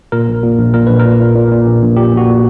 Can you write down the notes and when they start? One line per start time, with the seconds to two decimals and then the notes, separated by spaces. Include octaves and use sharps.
0.12 A#2 A#4
0.28 A#1
0.43 A#2
0.59 A#1
0.74 A#2 A#4
0.87 A#1 B4
1.00 A#4
1.05 A#2
1.20 A#2
1.35 A#2
1.51 A#2
1.66 A#1
1.82 A#1
1.97 A#2 G4
2.12 A#1
2.17 F#4
2.27 A#2